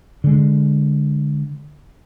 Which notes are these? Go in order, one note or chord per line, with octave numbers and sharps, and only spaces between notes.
D3 G#3